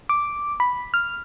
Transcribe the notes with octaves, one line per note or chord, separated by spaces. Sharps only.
D6
B5
F6